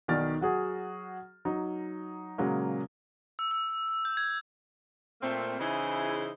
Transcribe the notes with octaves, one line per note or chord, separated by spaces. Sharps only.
B1 D#3 F#4 D5 F6 A6
F#3 F#4 G#4
F#3 D#4
A#2 C#3 F#3 G#3 A#3
E6
E6
G6
G#6
A#2 A3 A#3 C4
C#3 E3 D#4 E4 G#4 C5